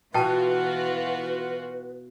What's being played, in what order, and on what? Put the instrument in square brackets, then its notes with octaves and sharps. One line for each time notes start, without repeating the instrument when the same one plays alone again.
[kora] B2 [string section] E3 F4 F#4 [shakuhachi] B4 [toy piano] G5 A5